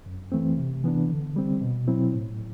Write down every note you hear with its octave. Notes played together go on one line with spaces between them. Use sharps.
F#2
E3 A3 C4
C3
E3 B3 D4
D3
G3 C4
B2
F#3 C4 E4
A2